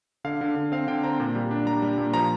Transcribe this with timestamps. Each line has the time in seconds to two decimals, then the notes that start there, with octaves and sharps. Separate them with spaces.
0.24 D3 F5
0.41 D3
0.56 D3
0.72 C4 F5
0.88 D3 G5
1.03 C4 A#5
1.20 A#2
1.36 G3
1.51 D4
1.66 G3 A#5
1.82 G3
1.98 A#2
2.14 F3 A#5